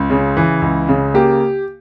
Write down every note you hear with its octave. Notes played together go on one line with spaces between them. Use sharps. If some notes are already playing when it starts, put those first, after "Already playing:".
Already playing: C#2
C#3
E3
C#2
C#3
A#3 G4